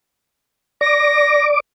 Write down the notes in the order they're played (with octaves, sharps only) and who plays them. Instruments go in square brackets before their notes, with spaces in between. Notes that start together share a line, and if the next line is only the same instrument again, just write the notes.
[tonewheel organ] D5 D6 [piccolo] A#6